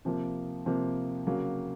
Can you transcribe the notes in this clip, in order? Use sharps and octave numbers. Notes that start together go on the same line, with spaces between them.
C3 F3 A#3
C3 F3 A#3
C#3 F#3 A#3